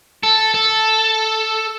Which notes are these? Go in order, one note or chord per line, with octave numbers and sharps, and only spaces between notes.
A4
A4